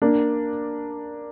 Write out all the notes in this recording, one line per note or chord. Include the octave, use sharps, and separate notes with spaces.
A#3 D4